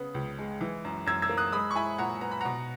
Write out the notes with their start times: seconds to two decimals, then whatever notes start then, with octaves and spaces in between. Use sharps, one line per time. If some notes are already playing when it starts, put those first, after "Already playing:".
Already playing: C#3 B3 D#6
0.14 C#2
0.39 G#3
0.61 E3
0.85 F#2
1.06 F#2 E6 G#6
1.22 E6 G#6
1.29 A#3
1.37 D#6 F#6
1.52 G#3 B5 D#6
1.71 C#6
1.75 E4 G#5 B5
1.98 A#2 F#5 A#5
2.21 B3 A#5
2.31 B5
2.41 B2 F#5 A#5